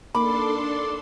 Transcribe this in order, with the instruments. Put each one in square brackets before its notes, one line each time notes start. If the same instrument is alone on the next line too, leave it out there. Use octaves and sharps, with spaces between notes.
[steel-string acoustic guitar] A#3 D#4 [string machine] D4 A4 C6 [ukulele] B5 [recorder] D6